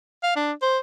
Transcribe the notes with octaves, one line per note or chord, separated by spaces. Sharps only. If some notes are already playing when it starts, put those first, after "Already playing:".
F5
D4
C5